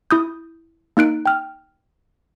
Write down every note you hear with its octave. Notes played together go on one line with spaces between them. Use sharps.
E4 D#6 G6
A#3 D#4 F#6 D7
G5 F6